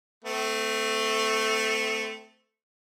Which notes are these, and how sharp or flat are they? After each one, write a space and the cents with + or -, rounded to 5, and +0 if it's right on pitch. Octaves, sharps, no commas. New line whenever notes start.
A3 +0 C4 -30